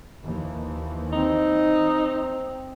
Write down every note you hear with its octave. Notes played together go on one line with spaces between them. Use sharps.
D#2 E3 F3
C4 D#4